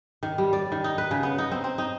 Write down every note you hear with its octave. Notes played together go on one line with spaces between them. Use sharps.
D#3
G3
D5
D#3
D#4
B4
C#3
B3
D#4
C4
C4
D#4